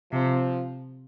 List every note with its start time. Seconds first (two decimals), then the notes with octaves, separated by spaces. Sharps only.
0.12 C3 F3